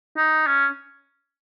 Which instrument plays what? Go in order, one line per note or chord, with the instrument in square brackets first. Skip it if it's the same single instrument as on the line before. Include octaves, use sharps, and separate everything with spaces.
[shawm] D#4
C#4